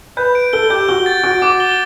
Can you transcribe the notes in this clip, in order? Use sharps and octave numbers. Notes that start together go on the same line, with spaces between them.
B4 G6
D7
A4 G7
G4 G6
F#4 G7
A6
F#4 D7
F#4 D6
G7